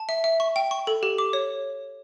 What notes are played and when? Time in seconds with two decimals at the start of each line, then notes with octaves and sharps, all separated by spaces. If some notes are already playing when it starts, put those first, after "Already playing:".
Already playing: A5
0.09 E5
0.24 E5
0.40 C#6
0.56 G5
0.71 C#6
0.87 A4
1.03 G4
1.18 D6
1.33 C#5